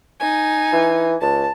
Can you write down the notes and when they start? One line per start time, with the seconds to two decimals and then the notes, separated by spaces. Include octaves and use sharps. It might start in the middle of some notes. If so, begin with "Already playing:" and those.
0.20 D#4 G#5
0.73 E3
1.22 C#2 A5